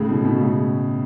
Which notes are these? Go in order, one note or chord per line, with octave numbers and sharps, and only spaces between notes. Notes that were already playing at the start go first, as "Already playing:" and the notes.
Already playing: A2 C#3
B2
B2
A2 C#3